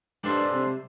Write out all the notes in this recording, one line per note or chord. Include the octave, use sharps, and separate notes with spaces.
G2 G3 D4 A4 C5
C3